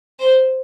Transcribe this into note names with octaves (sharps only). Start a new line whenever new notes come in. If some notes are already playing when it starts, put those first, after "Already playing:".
C5